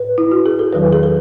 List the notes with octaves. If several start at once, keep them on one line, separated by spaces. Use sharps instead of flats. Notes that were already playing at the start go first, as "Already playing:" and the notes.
Already playing: A2 B4
E4
F#4
G#4
A4
E2 D#3 F#3 B4
G#4
A4